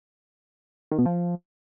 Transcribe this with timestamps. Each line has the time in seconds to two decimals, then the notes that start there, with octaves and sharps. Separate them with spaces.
0.91 D#3
0.99 B2
1.06 F3